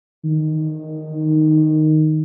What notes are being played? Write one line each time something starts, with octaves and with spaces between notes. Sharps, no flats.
D#3